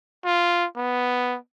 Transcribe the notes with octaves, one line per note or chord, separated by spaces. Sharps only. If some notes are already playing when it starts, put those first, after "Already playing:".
F4
B3